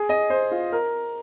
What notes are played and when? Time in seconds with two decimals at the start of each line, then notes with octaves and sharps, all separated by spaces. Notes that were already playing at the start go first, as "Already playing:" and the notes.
Already playing: G#4
0.09 D#5
0.30 C5
0.51 F4
0.72 A#4